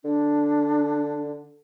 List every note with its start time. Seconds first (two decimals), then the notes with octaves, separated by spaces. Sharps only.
0.05 D3 D4